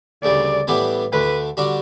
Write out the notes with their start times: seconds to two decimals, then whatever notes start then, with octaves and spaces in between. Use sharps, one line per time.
0.23 D2 C#3 G3 D5
0.68 A2 E3 G3 B3 D4
1.12 D2 D3 A3 B4
1.57 D3 G3 D4 F#4